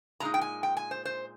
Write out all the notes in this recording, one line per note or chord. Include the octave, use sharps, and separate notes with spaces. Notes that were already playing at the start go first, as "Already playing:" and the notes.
A#2 G#3 D#4 A#5
G5
G#5
G5
G#5
C5
C5